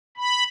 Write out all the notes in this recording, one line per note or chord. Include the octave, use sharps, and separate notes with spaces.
B5